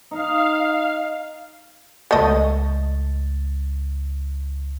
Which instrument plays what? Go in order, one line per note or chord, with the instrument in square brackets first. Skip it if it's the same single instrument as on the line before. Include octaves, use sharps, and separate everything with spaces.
[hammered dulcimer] D#4 [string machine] F5
[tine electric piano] C#2 A6 [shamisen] A3 A4 D#5